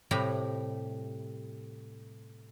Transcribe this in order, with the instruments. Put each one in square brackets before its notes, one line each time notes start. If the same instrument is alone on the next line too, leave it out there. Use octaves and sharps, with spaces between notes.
[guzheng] A2 C3 G3 A#5 B5